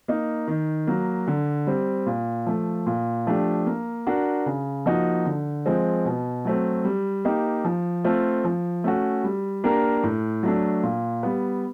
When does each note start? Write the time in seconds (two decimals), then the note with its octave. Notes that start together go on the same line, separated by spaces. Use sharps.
0.08 A#3 D#4
0.47 D#3
0.87 F#3 A#3
1.27 D3
1.67 G3 C4
2.06 A#2
2.46 F3 A3
2.87 A#2
3.27 F3 A3 D4 G4
3.66 A#3
4.07 D4 F#4 A#4
4.46 C#3
4.86 F3 A#3 D#4 F#4
5.26 D3
5.66 F3 G#3 C4
6.05 B2
6.45 F#3 A3 C4
6.85 G3
7.25 A#3 D#4 G4
7.65 F3
8.04 A3 C4 F4 A4
8.45 F3
8.84 A3 C#4 F#4
9.24 G3
9.64 A#3 D4 G4 A#4
10.04 A2
10.43 F#3 A3 D4
10.83 A#2
11.23 G3 B3